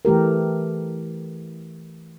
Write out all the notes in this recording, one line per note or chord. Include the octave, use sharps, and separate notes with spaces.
E3 A3 G4 A#4